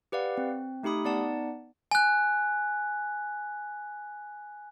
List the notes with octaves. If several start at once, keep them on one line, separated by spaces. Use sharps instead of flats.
G4 B4 D5 F5 F#5
C4
A3 D#4 G4 B5 D#6
B3 D#4 D5 F#5 A5
G#5 F#6